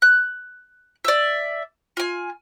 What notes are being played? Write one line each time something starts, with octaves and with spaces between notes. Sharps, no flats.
F#6
D5 E5
F4 G#5